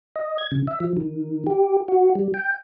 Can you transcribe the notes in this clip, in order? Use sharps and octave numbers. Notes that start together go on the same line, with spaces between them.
D#5
G#6
C#3
E5
F3
D#3
G4
F#4
G3
G5